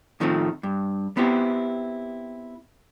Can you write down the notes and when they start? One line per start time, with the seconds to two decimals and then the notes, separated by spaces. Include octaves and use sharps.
0.20 A2 D#3 F3 A3 C4
0.63 G2
1.17 B3 C4 E4 G4